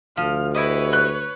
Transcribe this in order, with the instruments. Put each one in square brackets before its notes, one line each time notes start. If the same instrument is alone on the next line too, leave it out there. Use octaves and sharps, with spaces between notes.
[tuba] D2 [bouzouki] F3 [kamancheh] F6
[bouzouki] E4 G4 D#5 [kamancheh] B4 C#5
[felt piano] F#6